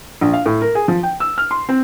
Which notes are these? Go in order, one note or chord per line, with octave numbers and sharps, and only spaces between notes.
A#1
F5
A2
A#4
G#4
F3
G5
E6
F6
C6
C4